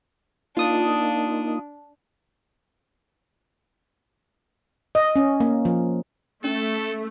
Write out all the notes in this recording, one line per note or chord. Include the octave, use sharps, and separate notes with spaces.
A#3 D4 D#4 F4 D#6
D#5
C#4
A#3
F3
A3 C#4 A4